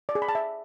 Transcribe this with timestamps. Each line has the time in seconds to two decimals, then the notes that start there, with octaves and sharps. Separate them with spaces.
0.09 D5
0.15 G#4
0.22 B5
0.29 A5
0.35 E5